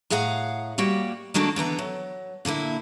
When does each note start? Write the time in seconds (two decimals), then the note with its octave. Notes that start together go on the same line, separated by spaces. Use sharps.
0.10 A2 G#4 F5 F#5 A#5
0.78 G3 A#3 F#4 G5
1.34 D#3 G#3 A#3 D4 F#4 A4
1.56 D3 E3 B3 A#5
1.79 F#3
2.45 A#2 D3 A#3 E4